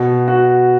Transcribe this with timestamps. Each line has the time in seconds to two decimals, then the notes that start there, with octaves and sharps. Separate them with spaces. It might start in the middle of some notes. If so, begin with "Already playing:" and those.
Already playing: B2
0.28 F#4